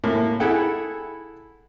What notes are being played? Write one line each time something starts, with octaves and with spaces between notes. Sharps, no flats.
A2 A#3
E4 G#4 A4 F#5 G5